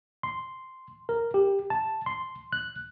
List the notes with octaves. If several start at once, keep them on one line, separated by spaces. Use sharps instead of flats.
C6
A#4
G4
A5
C6
F#6